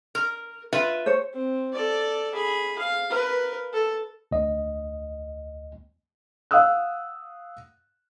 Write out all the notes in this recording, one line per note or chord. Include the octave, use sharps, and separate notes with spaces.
A#4
F4 B4 E5
C5 C#5
C4
A4 D5
G#4 B5
F5
A#4 B4
A4
D2 D#5
F5 F#5 D#6 E6 F#6